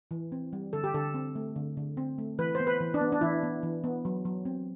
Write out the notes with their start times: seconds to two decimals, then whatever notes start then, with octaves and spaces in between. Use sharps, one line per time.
0.11 E3
0.32 C4
0.53 G3
0.73 D3 A4
0.84 G4
0.94 D3 A4
1.14 C4
1.35 A3
1.56 D3
1.77 D3
1.97 C4
2.18 A3
2.39 E3 B4
2.55 C5
2.60 B3
2.67 B4
2.81 E3
2.94 D4
3.01 B3
3.12 D4
3.21 E3 E4
3.43 B3
3.63 E3
3.84 B3
4.05 F#3
4.25 F#3
4.45 C4